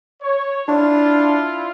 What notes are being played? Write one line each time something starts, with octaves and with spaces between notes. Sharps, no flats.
C#5
D4 E4 F4